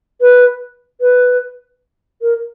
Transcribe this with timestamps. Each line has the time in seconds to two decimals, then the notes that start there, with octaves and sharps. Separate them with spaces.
0.21 B4
1.01 B4
2.22 A#4